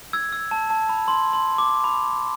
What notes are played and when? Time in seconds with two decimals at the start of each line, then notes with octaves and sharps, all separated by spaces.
0.13 E6 G#6
0.33 E6
0.51 A5
0.70 A5
0.89 B5
1.08 C6
1.33 C6
1.58 D6
1.84 B5